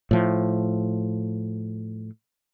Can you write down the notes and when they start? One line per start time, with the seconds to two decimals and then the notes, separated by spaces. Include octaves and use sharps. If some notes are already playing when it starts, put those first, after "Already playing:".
0.11 A2 F3